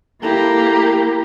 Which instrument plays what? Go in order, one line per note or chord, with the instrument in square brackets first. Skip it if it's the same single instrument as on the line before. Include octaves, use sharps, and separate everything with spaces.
[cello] A#3 [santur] E4 A4 [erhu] G4 [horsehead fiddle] A#5